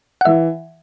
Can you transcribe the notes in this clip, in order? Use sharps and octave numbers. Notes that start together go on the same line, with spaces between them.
F#5
E3 E5